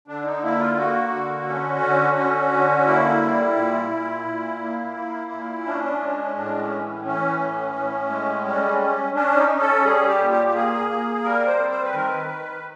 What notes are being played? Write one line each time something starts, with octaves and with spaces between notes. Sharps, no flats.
D3 D4
D#4
A#3 E4
F4
A#3 F#4
D3
C#4
D3
C#4
D3
A#3 E4
G3
A#2
A#2
A#2
A#3
A#3
A#2
C#4 D4
G#3
A2 D4
C#4
E3
E3 C#4
A2
A2
G#3
G3 C#4
C#4
C#4 D4
D#4
C#4
A4
G3 G#4
G4
A#2
G4
G4
A#3 G#4
A#3
G3 A#4
C5
C4
C5
B4
D#3 A#4
B4
D#3